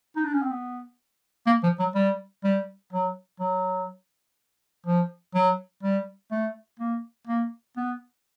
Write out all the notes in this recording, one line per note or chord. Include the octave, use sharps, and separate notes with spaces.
D#4
D4
C#4
C4
B3
A#3
F3
F#3
G3
G3
F#3
F#3
F3
F#3
G3
A3
A#3
A#3
B3